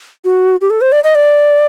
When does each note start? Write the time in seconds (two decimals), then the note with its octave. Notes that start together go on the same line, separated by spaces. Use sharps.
0.25 F#4
0.61 G4
0.70 A4
0.81 C5
0.92 D5
1.04 D#5
1.15 D5